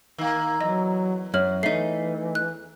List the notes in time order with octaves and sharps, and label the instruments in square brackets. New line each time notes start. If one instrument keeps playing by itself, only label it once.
[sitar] D#3 A#3
[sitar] E2 [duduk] F#3 [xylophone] D#5
[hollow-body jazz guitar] F#2 [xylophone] C#5 F6 F#7
[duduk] E3 [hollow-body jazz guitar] A3 D#4 [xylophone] E5 C7
[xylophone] F#6